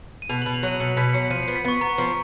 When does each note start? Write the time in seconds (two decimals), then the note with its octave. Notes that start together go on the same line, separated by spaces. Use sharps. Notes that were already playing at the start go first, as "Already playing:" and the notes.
0.22 D#7
0.29 B2 F7
0.42 F#7
0.46 B2
0.54 F7
0.63 F#3 D#7
0.80 B2 C#7
0.97 B2 B6
1.13 F#3 C#7
1.30 F3 D#7
1.43 C#7
1.48 B3
1.56 B6
1.65 B3 C#6
1.81 B3 A#5
1.98 F3 A#5